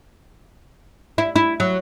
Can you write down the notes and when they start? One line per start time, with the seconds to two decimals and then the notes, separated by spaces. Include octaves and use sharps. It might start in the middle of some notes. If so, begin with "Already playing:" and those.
1.18 E4
1.36 E4
1.60 F#3